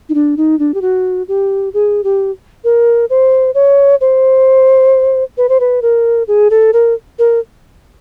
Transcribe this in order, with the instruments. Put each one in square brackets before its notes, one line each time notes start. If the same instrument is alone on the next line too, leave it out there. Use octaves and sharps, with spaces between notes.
[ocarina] D#4
D4
D#4
D4
G4
F#4
G4
G#4
G4
A#4
C5
C#5
C5
B4
C5
B4
A#4
G#4
A4
A#4
A#4